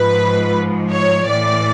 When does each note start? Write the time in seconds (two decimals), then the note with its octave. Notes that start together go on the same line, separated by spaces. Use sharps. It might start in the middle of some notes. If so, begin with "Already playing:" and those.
Already playing: G#2 F3 B4
0.91 C#5
1.28 A2 E3 D5